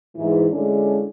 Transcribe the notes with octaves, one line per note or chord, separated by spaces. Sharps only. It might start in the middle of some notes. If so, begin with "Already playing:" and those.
G#2 E3
D3 G#3 C#4 D4 E4